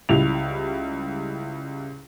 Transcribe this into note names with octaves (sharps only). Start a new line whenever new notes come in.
C#2 G3 E4 F7